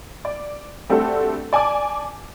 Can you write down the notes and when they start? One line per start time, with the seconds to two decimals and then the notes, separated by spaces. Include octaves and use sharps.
0.25 D5
0.89 G3 A3 C4 D4 F#4 A4
1.53 D5 G#5 A5 D6